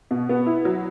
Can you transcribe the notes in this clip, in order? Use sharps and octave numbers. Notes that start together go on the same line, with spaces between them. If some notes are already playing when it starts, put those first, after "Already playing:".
B2
B3
E4
F#3